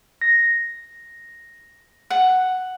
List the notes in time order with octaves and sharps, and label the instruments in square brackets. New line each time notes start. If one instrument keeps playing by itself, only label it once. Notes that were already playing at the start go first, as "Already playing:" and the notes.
[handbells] A#6
[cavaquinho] F#5